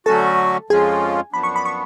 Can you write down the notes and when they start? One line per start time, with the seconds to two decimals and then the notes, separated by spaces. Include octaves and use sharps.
0.06 D3 F#3 A3 C#4 F#4 A4 A5
0.70 F2 F3 G#3 C#4 F4 G#4 G#5
1.32 F#2 F3 B3 D4 B5
1.43 C#6
1.56 B5
1.65 C#6